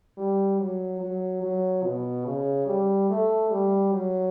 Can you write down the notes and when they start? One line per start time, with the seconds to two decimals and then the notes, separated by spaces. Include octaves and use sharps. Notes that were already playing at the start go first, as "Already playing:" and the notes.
0.18 G3
0.59 F#3
1.01 F#3
1.42 F#3
1.84 B2
2.25 C#3
2.66 G3
3.09 A3
3.50 G3
3.92 F#3